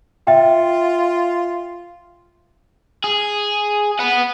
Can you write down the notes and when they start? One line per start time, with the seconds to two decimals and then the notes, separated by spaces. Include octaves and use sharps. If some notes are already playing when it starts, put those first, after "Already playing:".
0.27 F4 E5 G5
3.04 G#4
3.99 B4 F#5